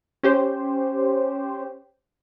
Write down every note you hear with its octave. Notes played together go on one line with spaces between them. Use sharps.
C#4 G4 C5